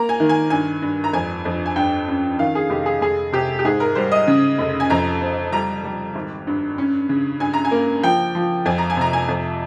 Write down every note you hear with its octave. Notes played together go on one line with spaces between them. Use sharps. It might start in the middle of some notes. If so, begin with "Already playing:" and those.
Already playing: A#3 A#5
G#5
D#3
G#5
G2 G#5
G2
A#5
F2 G#5
F2
G#5
G2 G5
C#4
D#3 F5
G#4
F1 G4
G#4
F1 G#4
C3 G4
G4
G#2 G#4
A#4
G3 C5
D#5
C#3
F1
G#5
F2 A#5
C4
G3 A#5
G3
G#1
G2
C#4
C#3
G2 G#5
A#5
G#5
A#3
F3 G5
F3
F2 G#5
A#5
G#5
C3 A#5
G#5
F2